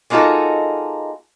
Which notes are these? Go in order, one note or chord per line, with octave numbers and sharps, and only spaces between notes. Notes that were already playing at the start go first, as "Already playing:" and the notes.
G#3 A#3 D#4 F4 F#4 A4